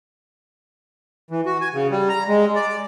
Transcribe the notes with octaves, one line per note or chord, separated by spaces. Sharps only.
E3
F#4
G#5
C#3
G3
A#5
G#3
D5